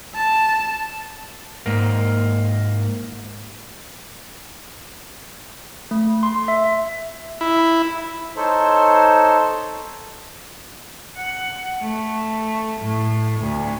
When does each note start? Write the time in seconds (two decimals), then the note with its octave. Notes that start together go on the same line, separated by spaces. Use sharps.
0.15 A5
1.66 G#2 A#3
5.91 A3
6.23 C6
6.48 E5
7.41 E4
8.36 D#4 A4 C5 C#5
11.16 F#5
11.81 A3
12.81 A2
13.40 D2